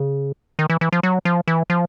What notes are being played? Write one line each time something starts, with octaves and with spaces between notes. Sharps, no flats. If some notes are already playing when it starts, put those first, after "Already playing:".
Already playing: C#3
D#3
E3
E3
F3
F#3
F3
E3
F3